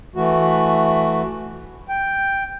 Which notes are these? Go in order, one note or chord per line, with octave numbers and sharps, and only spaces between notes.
E3 A3 F#4
G5